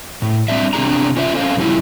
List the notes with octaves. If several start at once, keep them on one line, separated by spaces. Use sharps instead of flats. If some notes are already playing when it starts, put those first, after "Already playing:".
A2
G3 C4 D4 E5
C3 C4 D4 E4 G#4 A#5
C#4 F4 C5 E5
C#4 A4 C5 F5
F#2 C#3 G3 C#4 E4 F4